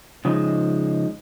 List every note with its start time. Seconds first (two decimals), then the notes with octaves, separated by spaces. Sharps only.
0.25 C#3 F3 G#3 D#4